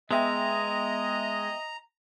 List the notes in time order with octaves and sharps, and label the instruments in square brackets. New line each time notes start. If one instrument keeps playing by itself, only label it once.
[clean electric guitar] G#3 [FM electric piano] B3 E5 G5 [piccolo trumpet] D#5 [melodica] A#5